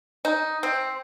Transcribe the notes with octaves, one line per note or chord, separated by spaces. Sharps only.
D#4
C4